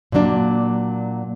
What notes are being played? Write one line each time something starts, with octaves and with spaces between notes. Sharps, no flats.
A#2 F#3 A#3 D4